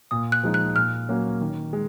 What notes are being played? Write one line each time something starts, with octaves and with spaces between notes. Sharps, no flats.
A#2 D#6
F#6
F3 G#3 D#4
F#6
A#2 F6
F#3 A#3 C#4
D#3
G#3